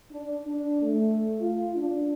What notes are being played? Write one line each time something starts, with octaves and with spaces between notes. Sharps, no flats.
D4
D4
A3
F4
D4